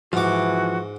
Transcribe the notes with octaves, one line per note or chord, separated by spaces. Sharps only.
G#2 E3 F3 F#4 D6